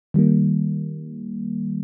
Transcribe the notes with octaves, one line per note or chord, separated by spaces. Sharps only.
D#3 G3 A#3